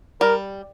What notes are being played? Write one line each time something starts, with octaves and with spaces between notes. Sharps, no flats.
G3 A#4